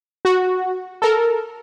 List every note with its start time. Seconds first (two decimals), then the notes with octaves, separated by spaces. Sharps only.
0.25 F#4
1.02 A4 A#4